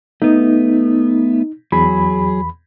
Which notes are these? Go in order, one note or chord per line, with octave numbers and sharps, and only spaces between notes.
A3 B3 D#4
E2 F#3 G#4 B5